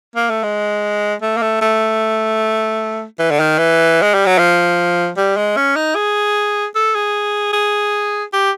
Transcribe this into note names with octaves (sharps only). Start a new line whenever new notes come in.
A#3
A3
G#3
A3
A#3
A3
A3
E3
D3
D#3
E3
G#3
G3
F#3
F3
G3
G#3
C#4
D#4
G#4
A4
G#4
G#4
G4